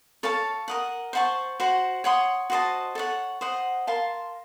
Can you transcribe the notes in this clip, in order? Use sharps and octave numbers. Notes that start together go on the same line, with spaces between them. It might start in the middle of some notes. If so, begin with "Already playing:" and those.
A4 C#5 F5 A5
A#4 D#5 F#5
C5 F#5 A5 C#6
F#4 C5 F#5
C#5 F#5 C6 D#6
F#4 C5 D#5 A5
A4 C#5 F#5
C5 D#5 F#5
A#4 F5 A5 C6